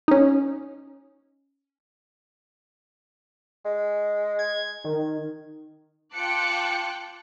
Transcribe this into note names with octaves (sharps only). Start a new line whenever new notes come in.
C#4 D#4
G#3
G#6
D#3
F4 G5 A5 D6 F#6 C#7